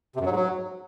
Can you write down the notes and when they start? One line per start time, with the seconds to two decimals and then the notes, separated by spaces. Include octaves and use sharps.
0.15 C3
0.21 F#2
0.26 F#3
0.31 G#2
0.36 F#3